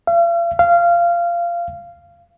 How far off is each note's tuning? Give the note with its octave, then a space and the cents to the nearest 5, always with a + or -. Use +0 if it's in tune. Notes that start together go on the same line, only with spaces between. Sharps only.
F5 -45
F5 -20